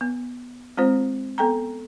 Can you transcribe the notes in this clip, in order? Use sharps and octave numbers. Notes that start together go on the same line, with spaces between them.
B3
G#3 C4 F4 C5
B3 A4 G5 A#5